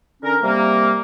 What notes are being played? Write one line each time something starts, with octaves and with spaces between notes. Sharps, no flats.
D3 C#4 A#4
C3 G3 A#3